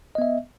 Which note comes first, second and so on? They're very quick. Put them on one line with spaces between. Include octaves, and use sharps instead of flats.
D#5 B3 E5